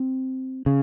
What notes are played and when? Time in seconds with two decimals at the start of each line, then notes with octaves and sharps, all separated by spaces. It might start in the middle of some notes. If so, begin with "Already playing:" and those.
Already playing: C4
0.66 C#3